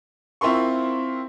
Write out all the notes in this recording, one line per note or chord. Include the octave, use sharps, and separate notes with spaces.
C4 E4 F4 A#4 C6 C#6